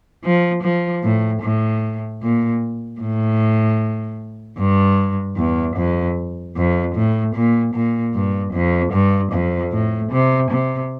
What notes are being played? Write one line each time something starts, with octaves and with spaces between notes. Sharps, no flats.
F3
F3
A2
A2
A#2
A2
G2
E2
F2
F2
A2
A#2
A#2
G2
F2
G2
F2
A2
C3
C3